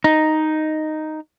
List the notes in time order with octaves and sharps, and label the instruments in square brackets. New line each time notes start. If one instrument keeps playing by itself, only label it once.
[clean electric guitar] D#4